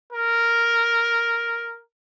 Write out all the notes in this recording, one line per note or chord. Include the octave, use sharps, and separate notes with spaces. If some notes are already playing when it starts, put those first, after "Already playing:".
A#4